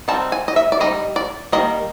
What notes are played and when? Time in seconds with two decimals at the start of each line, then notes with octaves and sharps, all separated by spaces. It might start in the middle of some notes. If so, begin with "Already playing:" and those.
0.08 G3 C4 D#4 A5
0.32 G#5
0.48 D#5
0.56 E5
0.72 D5
0.80 G3 C4 D#4 D#5
1.16 D5
1.52 D#3 G3 A#3 D#5